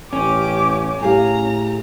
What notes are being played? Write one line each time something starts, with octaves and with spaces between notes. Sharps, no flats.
A1 C#4 G4 D6
A2 G4 G#4 F5 A#5